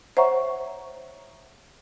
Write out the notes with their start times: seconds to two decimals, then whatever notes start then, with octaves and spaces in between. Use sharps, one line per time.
0.17 C5 C#5 E5 F#5 A#5 C#6